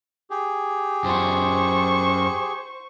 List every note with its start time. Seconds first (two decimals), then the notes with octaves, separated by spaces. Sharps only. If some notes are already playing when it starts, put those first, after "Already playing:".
0.30 G4 G#4
1.04 F#2 F4 C5 C#6